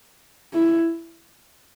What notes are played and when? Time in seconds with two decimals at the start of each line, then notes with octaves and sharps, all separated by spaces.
0.54 E4